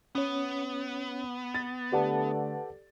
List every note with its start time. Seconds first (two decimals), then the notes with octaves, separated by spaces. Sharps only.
0.15 B3 C#4 C#5
1.54 A6
1.92 D3 A3 G4 A4 B4 D5 F#5 A5